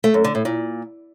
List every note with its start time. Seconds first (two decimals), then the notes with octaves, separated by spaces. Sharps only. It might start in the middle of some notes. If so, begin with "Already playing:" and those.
0.04 A3
0.14 F#2
0.24 D3
0.35 A2
0.45 A#2